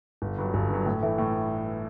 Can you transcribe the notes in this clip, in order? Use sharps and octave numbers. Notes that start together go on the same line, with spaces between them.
G1
G2 F#3
G1
G2 F#3
A2
E3 A3
A2